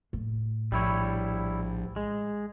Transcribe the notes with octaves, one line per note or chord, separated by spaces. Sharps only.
A2
A#1 G3 E4 C#5
G#3